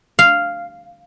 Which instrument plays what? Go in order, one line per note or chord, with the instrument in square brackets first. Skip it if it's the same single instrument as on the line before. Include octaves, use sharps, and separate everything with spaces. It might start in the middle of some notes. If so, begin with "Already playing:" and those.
[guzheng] F5